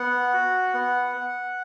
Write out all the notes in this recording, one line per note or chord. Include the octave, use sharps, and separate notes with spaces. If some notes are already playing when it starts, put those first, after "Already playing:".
Already playing: B3 F#5
F#4
B3